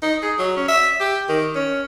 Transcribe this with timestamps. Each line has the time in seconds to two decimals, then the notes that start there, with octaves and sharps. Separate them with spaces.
0.02 D#4
0.22 G#4
0.39 F#3
0.57 C#4
0.68 E5
1.00 G4
1.29 D#3
1.55 C#4